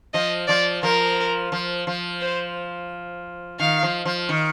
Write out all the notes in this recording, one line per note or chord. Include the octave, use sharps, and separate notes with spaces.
F3 D#5
F3 D5
F3 A#4
F3
F3
C5
D#3 F5
F3
F3
D#3